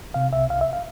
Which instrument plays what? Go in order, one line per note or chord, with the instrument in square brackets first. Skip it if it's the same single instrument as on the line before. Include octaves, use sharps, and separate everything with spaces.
[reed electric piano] C3 F5
C2 E5
C2 F5
E5
F5